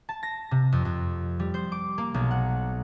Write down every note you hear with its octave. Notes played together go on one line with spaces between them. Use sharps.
A5
A#6
C3
F2
F2
G3
C5
D6
A#3
B1
F#5